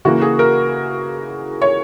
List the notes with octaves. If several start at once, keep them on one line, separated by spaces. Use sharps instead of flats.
C#3 E3 A#3 F#4
G#4
A#4
C#5